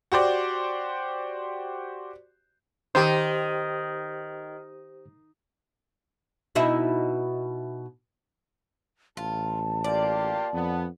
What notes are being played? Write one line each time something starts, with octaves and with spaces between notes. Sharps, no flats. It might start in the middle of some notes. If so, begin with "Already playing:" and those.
F#4 G4 C5 D5
D#3 G4 C5
B2 D#4 E4
A1 F4 A5
A#3 F4 G4 D5
F2 B3